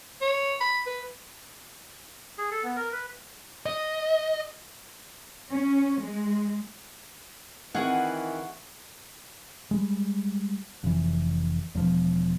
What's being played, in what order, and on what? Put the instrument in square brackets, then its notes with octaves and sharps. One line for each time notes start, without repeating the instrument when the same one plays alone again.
[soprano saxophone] C#5
B5
B4
[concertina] G#4
A4
B3
A#4
B4
[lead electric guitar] D#5
[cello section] C#4
G#3
[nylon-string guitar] D#3 C4 [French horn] E3 [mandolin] F#4 G#4 F#5
[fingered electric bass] G3 G#3
F1 E3
E1 F3